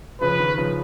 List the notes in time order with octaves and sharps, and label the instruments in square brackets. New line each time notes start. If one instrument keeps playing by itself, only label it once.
[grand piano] C#3 F3 [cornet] B4
[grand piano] D#3
C#3 F3